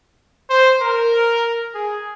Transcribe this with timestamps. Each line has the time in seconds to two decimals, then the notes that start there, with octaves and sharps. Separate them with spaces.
0.50 C5
0.81 A#4
1.74 G#4